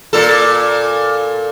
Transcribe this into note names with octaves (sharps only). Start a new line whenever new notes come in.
A#2 A4